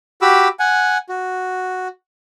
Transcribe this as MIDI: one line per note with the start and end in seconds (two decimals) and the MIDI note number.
0.22 0.48 66
0.22 0.48 67
0.22 0.48 83
0.22 0.48 86
0.22 0.48 88
0.59 0.98 78
0.59 0.98 80
1.09 1.88 66